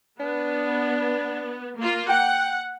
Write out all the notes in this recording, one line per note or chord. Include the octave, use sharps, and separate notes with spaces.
B3 D4
A#3 F4
F#5 G5